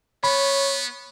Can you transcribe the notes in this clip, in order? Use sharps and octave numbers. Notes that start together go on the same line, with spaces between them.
B3 C#5 B5